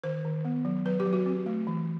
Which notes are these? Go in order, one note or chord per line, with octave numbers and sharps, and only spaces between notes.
D#3 C5
D#3
B3
F#3
F#3 B4
G4
F#3
F#4
C4
A3
E3